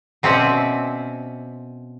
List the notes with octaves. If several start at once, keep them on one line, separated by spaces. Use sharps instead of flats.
B2 C4 C#4 D5 E5